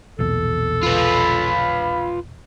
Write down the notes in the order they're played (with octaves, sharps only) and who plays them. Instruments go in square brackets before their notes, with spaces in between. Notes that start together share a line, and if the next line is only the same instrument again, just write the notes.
[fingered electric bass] A#1 E2 B2 [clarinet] A4
[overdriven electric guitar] F4 B4 [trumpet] B5